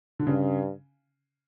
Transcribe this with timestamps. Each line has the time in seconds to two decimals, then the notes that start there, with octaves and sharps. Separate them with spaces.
0.19 D3
0.27 G2 C#3